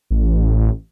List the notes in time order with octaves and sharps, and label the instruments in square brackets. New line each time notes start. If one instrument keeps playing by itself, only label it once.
[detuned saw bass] A1